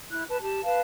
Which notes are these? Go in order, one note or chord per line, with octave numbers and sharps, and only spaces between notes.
E4 F#6
B4 A5
G4 A5
B4 F5 A5